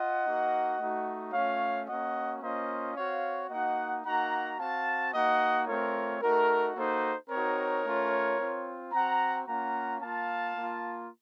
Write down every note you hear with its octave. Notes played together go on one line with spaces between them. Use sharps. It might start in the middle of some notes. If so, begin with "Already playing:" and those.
Already playing: F4 D#5 F#5
A#3 D#4 F#4
A3 D#4 F#4
A3 C#4 F4 C#5 F5
A#3 C#4 F#4 D#5 F#5
A#3 C#4 F4 C5 D#5
C4 F#4 C#5 F5
A#3 D#4 F#4 D#5 F#5
A#3 D#4 F#4 F#5 A#5
C4 F#4 F5 A5
A#3 D#4 F#4 D#5 F#5
A3 C4 F4 A#4 C#5
A3 D#4 F#4 A#4
A#3 D#4 F#4 A4 C5
C4 D#4 F#4 A#4 C#5
A3 C#4 F4
C4 F4
C4 F#4 F#5 A#5
A#3 C#4 F4 F#5 A#5
A#3 F4 F5 A5
A#3 F4